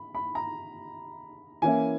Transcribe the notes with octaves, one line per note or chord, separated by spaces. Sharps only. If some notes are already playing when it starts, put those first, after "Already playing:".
Already playing: B5
B5
A#5
E3 A#3 C#4 E4 G#5